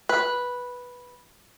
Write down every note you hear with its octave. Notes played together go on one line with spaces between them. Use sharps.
B4